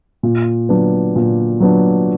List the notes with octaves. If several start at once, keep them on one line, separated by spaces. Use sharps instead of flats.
A#2
F#3 B3 D4
A#2
F#3 B3 D4